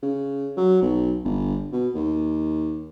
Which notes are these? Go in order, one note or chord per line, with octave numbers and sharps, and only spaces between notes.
C#3
F#3
B1
G1
B2
D#2